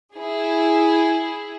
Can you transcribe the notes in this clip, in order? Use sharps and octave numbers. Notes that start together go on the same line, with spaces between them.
E4 G#4